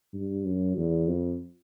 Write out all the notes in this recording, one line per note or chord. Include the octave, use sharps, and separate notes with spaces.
G2
F#2
E2
F2